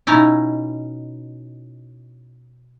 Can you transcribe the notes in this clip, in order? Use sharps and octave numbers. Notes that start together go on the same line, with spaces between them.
B2 C#4 D#4 E4